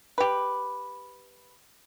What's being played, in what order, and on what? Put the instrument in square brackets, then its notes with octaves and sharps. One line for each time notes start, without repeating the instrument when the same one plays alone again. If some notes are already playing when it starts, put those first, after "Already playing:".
[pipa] G4 B4